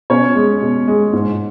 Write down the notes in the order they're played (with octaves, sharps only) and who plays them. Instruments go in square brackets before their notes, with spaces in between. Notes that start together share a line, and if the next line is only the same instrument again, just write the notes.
[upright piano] B2 C#4 C#5
G#3
B2
G#3
G#2